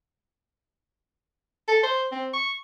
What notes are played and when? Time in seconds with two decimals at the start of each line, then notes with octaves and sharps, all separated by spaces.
1.68 A4
1.83 C5
2.12 C4
2.33 C#6